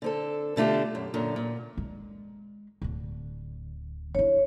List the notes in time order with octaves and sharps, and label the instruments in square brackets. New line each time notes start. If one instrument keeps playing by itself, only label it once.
[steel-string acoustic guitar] D3 C4 A4
B2 D3 A3 F4 G4
F#2
F#2 A#2 D3
A#2
[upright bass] G#3
D1 D3
[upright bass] D4 E4 [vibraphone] C#5